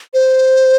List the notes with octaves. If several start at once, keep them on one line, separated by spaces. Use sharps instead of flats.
C5